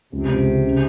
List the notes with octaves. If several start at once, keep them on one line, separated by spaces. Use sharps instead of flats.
C#2 C3
C#2
C#3
C#3